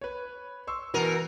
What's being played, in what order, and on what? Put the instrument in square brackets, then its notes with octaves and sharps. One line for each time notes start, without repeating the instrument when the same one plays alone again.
[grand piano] B4 C#5
C6 C#6 E6
[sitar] B2 A#4 [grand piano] E3 D#7 F7